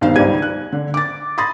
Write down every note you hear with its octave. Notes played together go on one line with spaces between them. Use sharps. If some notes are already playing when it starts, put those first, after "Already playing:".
B1 G2 D#3 C5 F5
C#2 G#2 G3 D4 G#6 D#7
F#6
D3
D6 A6
B5 C6 D#6 A6 A#6